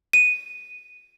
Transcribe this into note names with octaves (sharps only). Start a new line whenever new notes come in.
D#7